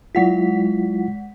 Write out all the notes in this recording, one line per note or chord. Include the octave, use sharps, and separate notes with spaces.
F#3 G#3 E4 F4 F#5 B6